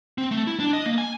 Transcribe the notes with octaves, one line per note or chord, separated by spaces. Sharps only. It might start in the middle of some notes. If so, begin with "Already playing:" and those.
C4
A3
E4
D4
D#5
A#3
G#5